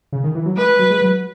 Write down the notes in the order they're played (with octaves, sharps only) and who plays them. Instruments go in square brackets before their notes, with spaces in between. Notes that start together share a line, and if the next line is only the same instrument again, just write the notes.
[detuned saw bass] C#3
D#3
E3
F#3
[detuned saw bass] G#3 [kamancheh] B4
[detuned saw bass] F#3
G#3
F#3